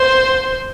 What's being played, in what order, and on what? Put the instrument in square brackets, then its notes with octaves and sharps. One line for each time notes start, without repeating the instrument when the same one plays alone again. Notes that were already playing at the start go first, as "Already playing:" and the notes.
Already playing: [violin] C5